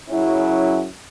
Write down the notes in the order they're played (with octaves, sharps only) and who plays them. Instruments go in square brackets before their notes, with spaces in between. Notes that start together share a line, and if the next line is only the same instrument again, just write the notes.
[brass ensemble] F#2 C#3 F#3 C#4 E4